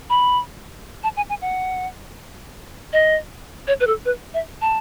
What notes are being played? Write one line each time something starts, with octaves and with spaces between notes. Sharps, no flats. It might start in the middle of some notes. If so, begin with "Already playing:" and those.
B5
A5
G#5
G#5
F#5
D#5
C#5
B4
A4
B4
E5
A5